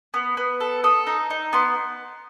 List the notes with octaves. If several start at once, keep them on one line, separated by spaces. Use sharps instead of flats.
B3
B3
A4
A4 D#6
D#4
D#4
B3 C6